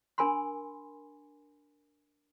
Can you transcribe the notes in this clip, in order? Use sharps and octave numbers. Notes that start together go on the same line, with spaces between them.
D4 A#4 G#5 B5 C6